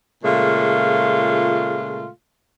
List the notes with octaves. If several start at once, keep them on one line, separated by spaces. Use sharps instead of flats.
A#2 C#3 G#3 A3 F4